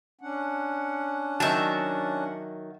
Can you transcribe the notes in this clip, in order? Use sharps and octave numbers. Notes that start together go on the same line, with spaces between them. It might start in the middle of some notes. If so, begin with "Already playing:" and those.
C#4 D4 F#5
D#3 F#3 E5 A5